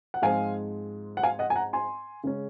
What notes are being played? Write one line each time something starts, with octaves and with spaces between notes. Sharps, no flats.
F#5
G#2 F3 G#3 C4 F5 G#5
F#5
F5 G#5
D#5 F#5
G#5
F#5 A#5
G#5 C6
C#3 G#3 C#4